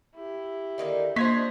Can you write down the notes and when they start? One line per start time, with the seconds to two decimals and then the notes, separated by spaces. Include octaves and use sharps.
0.15 E4 G4
0.78 D3 D#3 A#3
1.16 A#3 D4 F4 C5 D#5 G#6 B6